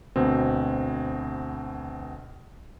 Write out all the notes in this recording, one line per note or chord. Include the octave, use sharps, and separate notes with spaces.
D2 B2 C4